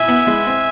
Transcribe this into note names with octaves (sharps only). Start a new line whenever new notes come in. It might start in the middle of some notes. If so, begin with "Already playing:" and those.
Already playing: B2 E4 E5 G#5
B3
G#3
C4